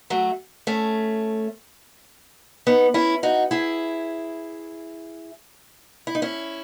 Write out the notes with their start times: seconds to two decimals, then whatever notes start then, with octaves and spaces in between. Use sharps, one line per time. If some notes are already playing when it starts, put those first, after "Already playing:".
0.10 F#3 A3
0.67 A3 C#4
2.67 B3 D#4
2.94 C#4 E4
3.23 D#4 F#4
3.51 E4 G#4
6.07 E4
6.15 D#4
6.22 C#4 E4